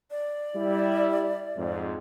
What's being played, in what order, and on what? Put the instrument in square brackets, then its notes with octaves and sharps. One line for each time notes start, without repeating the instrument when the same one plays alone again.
[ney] D5
[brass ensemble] G3 E4
F2 G#2